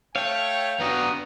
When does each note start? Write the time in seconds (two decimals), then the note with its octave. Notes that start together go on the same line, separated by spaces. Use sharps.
0.16 A3 C#5 F5 G5
0.79 B3 D4 F#4 A#5 D#6